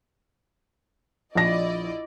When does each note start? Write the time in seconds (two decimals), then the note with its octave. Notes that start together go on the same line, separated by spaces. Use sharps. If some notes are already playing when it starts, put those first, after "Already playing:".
1.35 A#1 E4 D5 D#5 A#6